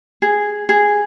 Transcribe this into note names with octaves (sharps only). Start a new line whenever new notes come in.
G#4
G#4